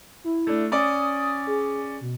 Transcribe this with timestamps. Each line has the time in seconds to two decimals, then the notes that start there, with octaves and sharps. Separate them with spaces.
0.24 E4
0.47 A3 D4
0.72 C#4 D5 D#6
1.47 G#4
2.01 B2